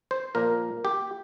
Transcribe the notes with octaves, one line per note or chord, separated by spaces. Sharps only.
C5
A#2 F3 A#3 A#4
G4